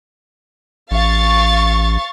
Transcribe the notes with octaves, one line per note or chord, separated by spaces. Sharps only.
A1 F5 C#6 A6